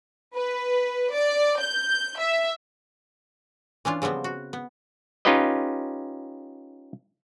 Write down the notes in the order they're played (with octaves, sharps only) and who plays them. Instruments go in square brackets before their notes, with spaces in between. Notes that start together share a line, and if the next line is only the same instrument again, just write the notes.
[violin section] B4
D5
G6
E5
[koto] E3 C#4 D4 F4
C#3 F3 G3 B3 C4
F#4
B3
[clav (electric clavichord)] C#4 D#4 F4 G4 B4 D#5